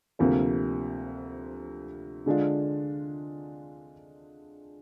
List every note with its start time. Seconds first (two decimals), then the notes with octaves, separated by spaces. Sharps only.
0.19 D2 C3 F3 A#3
2.26 D3 G#3 D4 F4